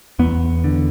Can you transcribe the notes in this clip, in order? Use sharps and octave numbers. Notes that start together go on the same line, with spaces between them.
E2 B3
D3